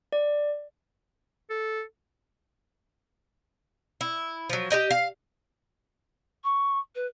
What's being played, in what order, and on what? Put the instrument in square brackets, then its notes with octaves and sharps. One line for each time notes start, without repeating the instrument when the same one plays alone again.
[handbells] D5
[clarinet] A4
[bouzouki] E4
F3 F#3
G4 A#4 D#5 G5
F5
[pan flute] C#6
B4